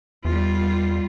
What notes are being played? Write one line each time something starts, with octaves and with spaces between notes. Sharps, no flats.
E2 G3 F4